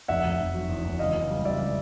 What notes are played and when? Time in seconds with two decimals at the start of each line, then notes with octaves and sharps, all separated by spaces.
0.08 F1 E5 F#5
0.24 F1
0.39 F1
0.54 F#3
0.69 E2
0.85 E2
0.99 C#2 D#5 F5
1.15 C#2
1.30 G3
1.45 C#2 D5 E5
1.61 G3